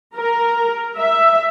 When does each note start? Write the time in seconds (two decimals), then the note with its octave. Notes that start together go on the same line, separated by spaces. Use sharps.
0.16 A#4
0.97 E5